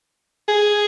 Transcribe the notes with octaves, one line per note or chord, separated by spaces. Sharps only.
G#4